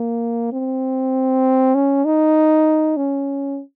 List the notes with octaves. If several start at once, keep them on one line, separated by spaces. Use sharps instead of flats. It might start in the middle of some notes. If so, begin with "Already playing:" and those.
Already playing: A#3
C4
C#4
D#4
C#4